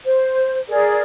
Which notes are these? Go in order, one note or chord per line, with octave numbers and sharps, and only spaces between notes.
C5
G#4 A#4 D5